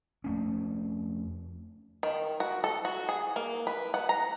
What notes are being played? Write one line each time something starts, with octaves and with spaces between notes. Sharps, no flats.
F2 A3 C#4
D#3
F#4
A4
F#4
G#4
A#3
B4
F#5
A#5